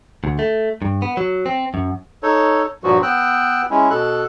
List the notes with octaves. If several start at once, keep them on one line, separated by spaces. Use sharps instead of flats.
D2
A3
G2
B3
F#3
C4
F#2
D#4 A4 C#5
G2 A#2 F3 F#3 F#4
B3 G5 E6 F#6
G#3 C#4 E4
B2 A4 F#6